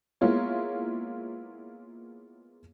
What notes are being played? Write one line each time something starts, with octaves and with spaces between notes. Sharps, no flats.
G#3 A#3 B3 E4 F4 C#5